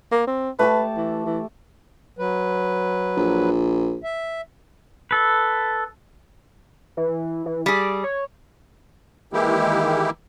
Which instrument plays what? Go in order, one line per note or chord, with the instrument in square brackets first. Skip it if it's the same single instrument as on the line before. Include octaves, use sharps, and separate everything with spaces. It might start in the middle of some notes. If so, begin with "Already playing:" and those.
[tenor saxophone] A#3
C4
[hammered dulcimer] A3 G4 A5 [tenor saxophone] B4
[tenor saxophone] E3
E3
[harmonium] F#3 B4
[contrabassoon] A#1
[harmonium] E5
[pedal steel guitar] A4 B4
[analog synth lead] E3
E3
[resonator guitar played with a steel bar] G3 G#4 [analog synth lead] D6
[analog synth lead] C#5
[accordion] D#3 E3 G#3 A#3 E4 G4